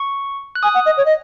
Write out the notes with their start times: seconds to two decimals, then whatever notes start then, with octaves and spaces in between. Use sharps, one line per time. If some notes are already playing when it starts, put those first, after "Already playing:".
Already playing: C#6
0.55 F#6
0.63 G#5 D#6
0.74 F#5
0.86 D#5
0.97 C#5
1.06 D#5